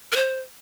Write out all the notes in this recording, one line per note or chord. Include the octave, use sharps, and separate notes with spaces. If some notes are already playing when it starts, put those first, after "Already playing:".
A#4
C5